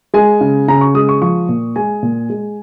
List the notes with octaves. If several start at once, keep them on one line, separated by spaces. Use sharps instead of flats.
G#3 G#5
C#3
C#3 A#5
C#6
G#3 D#6
C#6
F3 C#6
A#2
G#3 G#5
A#2
G#3